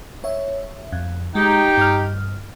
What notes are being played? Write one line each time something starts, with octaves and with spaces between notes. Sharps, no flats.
C#5 E5
F2
G#3 D#4 G4 G5
G2 D#5 F6